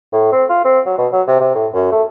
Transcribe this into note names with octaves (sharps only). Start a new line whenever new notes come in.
A2
C4
F4
C4
F#3
B2
F#3
C3
C3
A2
F#2
A3